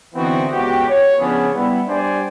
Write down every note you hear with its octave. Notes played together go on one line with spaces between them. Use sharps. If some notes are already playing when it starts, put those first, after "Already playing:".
D3 E3 B3 C4 D#4 F#4
C#2 B3 F#4 G4
C#5
C#3 F3 B3 C#4 D4 G#4
G3 B3 E4
G3 D4 C5 D5 G#5